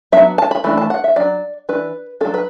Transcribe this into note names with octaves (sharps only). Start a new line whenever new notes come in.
F#3 B3 D4 E5
A5
B5
E3 A3 D4 B5
A5
F#5
E5
F#3 D4 D5
E3 D4 B4
F#3 A3 D4 A4
B4